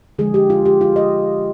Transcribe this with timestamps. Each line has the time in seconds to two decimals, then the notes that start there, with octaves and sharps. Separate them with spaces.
0.19 D3 F3 G#3 G#4
0.34 G4
0.50 F4
0.66 G4
0.81 F4
0.96 D#5